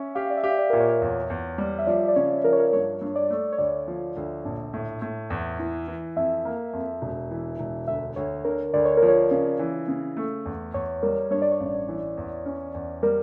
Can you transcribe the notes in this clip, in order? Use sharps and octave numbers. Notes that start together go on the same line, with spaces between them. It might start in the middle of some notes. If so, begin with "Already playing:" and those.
Already playing: C#4 E5
G4 F5
D5
E5
G4
E5
D5
A#2 A#4
C#5
E2
E2
G3
E5
F3 D5
D5
C#3 C#5
F3 A#4
C#5
A#4
G2 C#5
G2
D5
A3
C#5
D2 D5
F3
D2
A#1
A2
A2
E2
E3
E3
F2 E5
A#3
F2
E1
E3
E1
D2 E5
D2 C#5
D3 A#4
D2 D5
C#5
A#4
F3
C#5
C#3
E3
C#3
A3
E2
E2 C#5
G3 A#4
G2 C#5
D5
C#5
A1
E3
E2
C#4
E2
G3 A#4